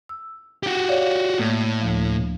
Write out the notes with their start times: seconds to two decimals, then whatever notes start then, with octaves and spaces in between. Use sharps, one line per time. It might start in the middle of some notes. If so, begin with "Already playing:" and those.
0.09 E6
0.63 F#4 G4
0.88 C#5 D5 F5
1.39 A2 A#3
1.81 D2 F3